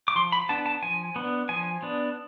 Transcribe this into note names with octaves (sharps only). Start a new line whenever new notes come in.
D6
F3 C6
B5
B3 D4 A5
A5
F3 G#5
B3 D4
F3 G#5
B3 D4